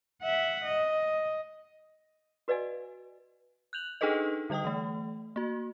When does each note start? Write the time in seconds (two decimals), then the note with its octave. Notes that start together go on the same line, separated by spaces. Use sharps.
0.22 E5 F#5
0.65 D#5
2.48 F#4 B4 D5 D#5 F5 G#5
3.73 F#6 G6 F7 F#7
4.01 D4 D#4 G#4 A4 B4 D#5
4.50 D3 G3 D#5 G5 D#6
4.65 E3 A3
5.36 A#3 F#4